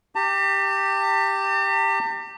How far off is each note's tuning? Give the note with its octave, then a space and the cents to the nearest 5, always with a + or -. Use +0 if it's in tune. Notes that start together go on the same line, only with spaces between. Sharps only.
G4 +0 A5 +45